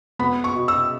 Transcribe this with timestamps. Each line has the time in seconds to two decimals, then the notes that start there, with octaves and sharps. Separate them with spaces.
0.19 B3 B5
0.44 C#6
0.56 B2
0.68 E6